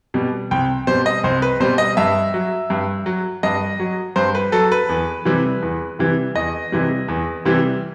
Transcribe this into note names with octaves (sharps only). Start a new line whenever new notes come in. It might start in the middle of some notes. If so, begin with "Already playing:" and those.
B2 G3
C2 G5
B2 G3 C5
D#5
C2 C5
B4
B2 G3 C5
D#5
G2 E5
F#3
G2
F#3
G2 D#5
F#3
G2 C5
B4
F#3 A4
B4
E2
C3 E3 G3
E2
C3 E3 G3
E2 D#5
C3 E3 G3
E2
C3 E3 G3